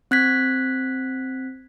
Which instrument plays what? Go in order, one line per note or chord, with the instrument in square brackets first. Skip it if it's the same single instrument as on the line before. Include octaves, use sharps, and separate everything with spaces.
[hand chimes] C4 F#6 G#6 B6